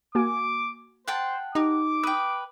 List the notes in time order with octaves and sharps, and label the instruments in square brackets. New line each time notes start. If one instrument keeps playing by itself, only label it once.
[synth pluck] A#3 F#4 G#5 [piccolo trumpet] D6
[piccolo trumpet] C5 [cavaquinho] F#5 G5 A5
[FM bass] D#4 [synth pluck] G4 [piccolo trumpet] D6
[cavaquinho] B4 G5 [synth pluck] D#6